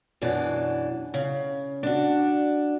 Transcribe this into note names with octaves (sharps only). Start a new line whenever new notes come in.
F#2 B2 E3 D4
C#3
D4 F#4